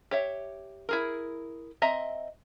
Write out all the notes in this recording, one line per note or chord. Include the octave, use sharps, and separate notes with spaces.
G4 C#5 E5
E4 G#4 A#4
C4 D#5 E5 A#5